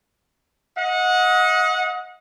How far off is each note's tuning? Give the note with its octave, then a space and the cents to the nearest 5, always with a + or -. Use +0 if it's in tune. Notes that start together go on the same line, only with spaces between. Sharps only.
D#5 +25 F#5 -25